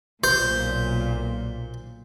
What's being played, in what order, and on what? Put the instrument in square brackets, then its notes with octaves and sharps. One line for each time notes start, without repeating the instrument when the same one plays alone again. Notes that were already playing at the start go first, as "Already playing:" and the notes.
[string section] B1 A#2 [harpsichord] C5